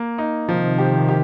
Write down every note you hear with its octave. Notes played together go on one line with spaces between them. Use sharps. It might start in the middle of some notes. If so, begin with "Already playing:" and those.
Already playing: A#3
D#4
C3 D#3 F3
G4
G4